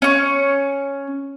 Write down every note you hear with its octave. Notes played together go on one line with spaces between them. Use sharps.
C#4 C#6